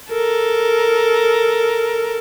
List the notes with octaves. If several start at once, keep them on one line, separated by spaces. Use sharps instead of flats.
A4 A#4